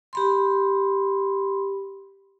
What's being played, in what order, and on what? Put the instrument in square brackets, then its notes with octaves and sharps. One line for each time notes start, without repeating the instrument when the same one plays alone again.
[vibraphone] G4 B5 C6